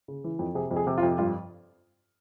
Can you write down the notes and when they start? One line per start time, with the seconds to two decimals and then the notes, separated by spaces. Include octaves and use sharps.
0.08 C#3
0.24 E3
0.39 F2
0.55 C3 G#4
0.71 F2
0.76 G#4
0.87 C3
0.98 F4
1.03 F2
1.18 G2 F4